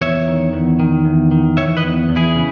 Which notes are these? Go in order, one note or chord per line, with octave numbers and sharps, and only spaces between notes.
E2 C#5 E5
D#3
E2
D#3
E2
D#3
E3 C#5 E5
B4 D#5
E2
E2
E4 G#4
C#3